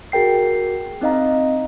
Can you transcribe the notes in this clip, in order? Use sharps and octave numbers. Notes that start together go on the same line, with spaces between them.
F#4 G#4 A#4 G5 C7
C4 D#4 D#5 F5 A#5